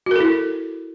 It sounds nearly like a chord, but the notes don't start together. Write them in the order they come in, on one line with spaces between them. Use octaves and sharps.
F#4 A#4 A4 E4